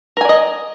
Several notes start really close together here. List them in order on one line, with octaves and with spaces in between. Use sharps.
A#4 G#5 D5 D#5